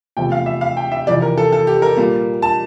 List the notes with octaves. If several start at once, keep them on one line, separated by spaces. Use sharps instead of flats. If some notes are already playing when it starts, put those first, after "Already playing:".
E2 C3 F3 A3 G5
F5
E5
F5
G5
E5
F2 C3 E3 D5
A#4
A4
A4
G4
A#4
A#2 G3 A#3
A5